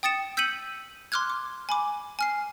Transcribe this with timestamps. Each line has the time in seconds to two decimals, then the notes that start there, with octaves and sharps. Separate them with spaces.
0.03 G5 D#6 A6 C#7 E7
0.37 E6 G6 B6 C#7 D#7 F#7
1.12 C6 D6 F6 F#6 G#6
1.30 D6
1.69 G#5 B5 D6
2.19 G#5 F6 C7